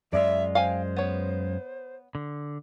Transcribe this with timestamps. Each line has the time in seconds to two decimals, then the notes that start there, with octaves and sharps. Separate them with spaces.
0.13 F#2 G#3 F4 D5 E5
0.55 C5 F5 G5 G#5
0.97 B3 C#5
2.15 D3